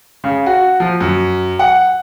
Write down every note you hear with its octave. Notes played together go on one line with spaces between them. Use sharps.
C#3
F#4
F3
F#2
F#5